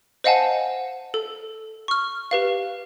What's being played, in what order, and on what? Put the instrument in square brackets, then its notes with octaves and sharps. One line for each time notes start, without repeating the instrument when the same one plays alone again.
[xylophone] C5 D#5 F5 F#5 G#5 A5
A4
C#6 F6
G4 B4 F5